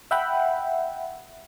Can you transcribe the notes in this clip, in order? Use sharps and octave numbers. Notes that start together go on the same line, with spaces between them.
E5 F#5 G5 B5